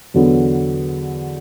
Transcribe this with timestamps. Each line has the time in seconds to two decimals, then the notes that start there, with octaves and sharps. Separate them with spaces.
0.14 E2 D3 F#3 B3